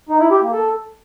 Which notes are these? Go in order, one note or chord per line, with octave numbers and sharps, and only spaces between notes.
D#4
E4
G4
A#3
A4